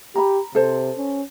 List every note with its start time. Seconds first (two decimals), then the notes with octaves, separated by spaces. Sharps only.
0.16 G4 A#5 B5
0.55 C3 A4 C5
0.98 C#4